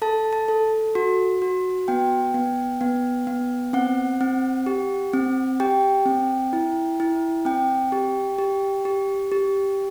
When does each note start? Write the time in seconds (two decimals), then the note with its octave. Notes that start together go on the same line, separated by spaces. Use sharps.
0.02 A4 A5
0.33 A5
0.48 A4
0.95 F#4
1.42 F#4
1.88 B3 G5
2.34 B3
2.81 B3
3.27 B3
3.73 C4 F#5
4.21 C4
4.66 G4
5.13 C4
5.60 G4 G5
6.06 C4
6.53 E4
7.00 E4
7.45 C4 G5
7.92 G4
8.39 G4
8.85 G4
9.32 G4